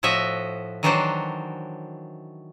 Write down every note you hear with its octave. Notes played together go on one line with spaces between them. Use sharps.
A2 F3 F#4 D#5 E5
D#3 E3 F#3 D4 F#4 C5